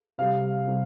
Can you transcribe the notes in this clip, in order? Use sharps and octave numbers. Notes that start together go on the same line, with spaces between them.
C3 G3 F5
C3 G3